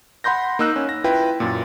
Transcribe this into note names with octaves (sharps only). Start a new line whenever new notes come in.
F#5 B5 C6 G6 A#6
A#3 D#4 E6 F#6
C#4
A#6
E4 F4 B4 G5
F#2 A#2